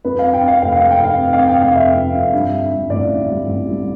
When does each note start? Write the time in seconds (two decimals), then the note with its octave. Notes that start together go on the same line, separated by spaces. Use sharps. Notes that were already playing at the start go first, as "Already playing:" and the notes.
0.05 F2 B4
0.19 F5
0.24 C3
0.33 G5
0.43 C3
0.48 F5
0.62 F1 F5
0.75 F5
0.81 F2
0.91 G5
1.00 F2 F5
1.19 C3
1.33 F5
1.38 C3
1.48 G5
1.57 F1 F5
1.75 F2 E5
1.94 F2
2.15 F2
2.33 G2
2.52 D3
2.71 G2
2.90 A1 D5
3.09 D3
3.28 G3
3.47 A1
3.66 G3